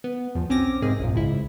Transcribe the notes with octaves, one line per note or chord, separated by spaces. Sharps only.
B3
E2 F3
B1 C4 C#4 D6 A#6
G#2 C3 A#3 G#4
A#1 F#2 A#2
C#2 G#2 E4